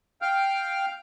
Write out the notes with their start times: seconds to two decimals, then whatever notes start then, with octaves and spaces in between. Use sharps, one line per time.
0.22 F5 G5 F6